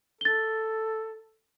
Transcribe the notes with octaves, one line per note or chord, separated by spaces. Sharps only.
A4 A6 G7